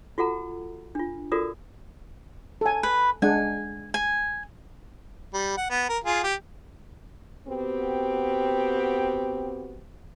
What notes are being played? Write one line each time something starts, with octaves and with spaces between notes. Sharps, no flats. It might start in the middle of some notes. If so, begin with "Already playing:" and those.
F4 F#4 A4 F#5 A#5
D4 F4
F4 F#4 A4 A#4 D5 D#6
A4 G#5
B4
G#3 D4 F#5 G#5
G#5
G3
F#5
B3
A#4
F4 G#4
G4
B3 C4 F#4 G4